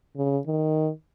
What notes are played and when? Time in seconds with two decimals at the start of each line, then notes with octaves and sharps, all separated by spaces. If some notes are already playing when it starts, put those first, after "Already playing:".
0.17 C#3
0.47 D#3